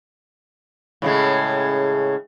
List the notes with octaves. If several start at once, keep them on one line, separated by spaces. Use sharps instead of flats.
A2 C#3 G#3